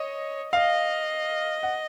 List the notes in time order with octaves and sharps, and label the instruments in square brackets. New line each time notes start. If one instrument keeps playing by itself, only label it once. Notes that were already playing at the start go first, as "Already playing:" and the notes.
Already playing: [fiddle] C#5 [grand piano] D#5
[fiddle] D#5 [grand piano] F5
[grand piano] F#5